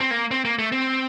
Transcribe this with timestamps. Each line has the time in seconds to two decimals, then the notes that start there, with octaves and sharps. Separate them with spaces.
0.01 C4
0.11 A#3
0.31 C4
0.45 A#3
0.59 A3
0.72 C4